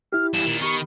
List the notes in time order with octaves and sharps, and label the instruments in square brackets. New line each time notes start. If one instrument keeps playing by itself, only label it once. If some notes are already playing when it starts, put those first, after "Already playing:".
[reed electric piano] E4 G4 [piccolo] F6
[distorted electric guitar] E2 G2 [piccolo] E7
[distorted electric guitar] A#2 D#3
[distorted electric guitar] D#3 [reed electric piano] B3 G4 B5 [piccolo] C#6